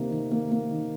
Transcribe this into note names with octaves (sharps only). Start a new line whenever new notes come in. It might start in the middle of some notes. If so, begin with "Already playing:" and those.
Already playing: C3 D#3 A#3
D#3
A#3
A#3
D#3